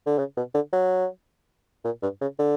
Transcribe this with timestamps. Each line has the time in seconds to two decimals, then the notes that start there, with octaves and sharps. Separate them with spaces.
0.06 D3
0.18 C#3
0.37 B2
0.54 D3
0.73 F#3
1.85 A#2
2.02 G2
2.21 C#3
2.39 D3